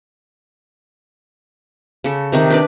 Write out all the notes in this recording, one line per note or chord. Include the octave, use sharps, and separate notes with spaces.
C#3 A4
C3 D#3 D#4
D4 B4 D5